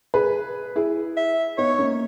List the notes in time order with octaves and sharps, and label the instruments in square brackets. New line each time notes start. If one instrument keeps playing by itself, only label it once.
[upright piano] G#4 B4
E4 G#4
[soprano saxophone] E5
[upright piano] B3 D#4 [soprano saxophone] C#5
[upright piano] A#3 C#4